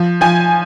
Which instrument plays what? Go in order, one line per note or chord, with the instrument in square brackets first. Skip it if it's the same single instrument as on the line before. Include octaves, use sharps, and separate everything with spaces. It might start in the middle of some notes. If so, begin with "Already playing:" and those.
Already playing: [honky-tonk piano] F3
F3 G#5